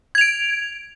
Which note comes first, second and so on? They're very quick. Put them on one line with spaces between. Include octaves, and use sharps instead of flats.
G#6 F7 D7